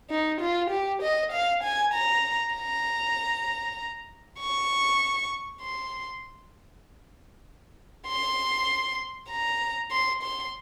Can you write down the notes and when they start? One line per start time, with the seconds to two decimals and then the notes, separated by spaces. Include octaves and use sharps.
0.10 D#4
0.41 F4
0.70 G4
1.02 D#5
1.32 F5
1.63 G#5
1.94 A#5
2.55 A#5
4.39 C#6
5.63 C6
8.07 C6
9.30 A#5
9.91 C6
10.23 C6